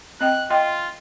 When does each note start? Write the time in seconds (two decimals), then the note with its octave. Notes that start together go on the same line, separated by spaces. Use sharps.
0.20 C4 D#5 G5 F#6
0.50 F4 D#5 G5 C6